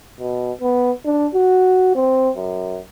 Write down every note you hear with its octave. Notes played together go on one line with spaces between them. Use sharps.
B2
B3
D4
F#4
C4
F#2